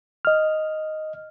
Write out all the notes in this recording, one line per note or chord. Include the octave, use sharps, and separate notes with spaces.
D#5 F6